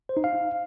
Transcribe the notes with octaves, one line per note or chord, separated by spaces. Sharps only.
C5
D#4
F5